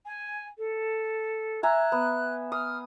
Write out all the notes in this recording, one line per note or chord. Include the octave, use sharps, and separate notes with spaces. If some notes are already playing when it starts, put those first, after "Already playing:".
G#5
A4
E5 G#5 A#5 F#6
B3
D#6 F6